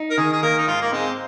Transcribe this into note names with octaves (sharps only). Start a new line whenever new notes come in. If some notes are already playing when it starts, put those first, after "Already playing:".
Already playing: D#4
A#4
D#3 G#4
G#4
A#3 A#4
D#4
G#2 F4
A#3
G#3 C4